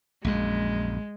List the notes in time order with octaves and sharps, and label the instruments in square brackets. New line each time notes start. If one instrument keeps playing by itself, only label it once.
[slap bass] A#1 F#2 [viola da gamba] G#3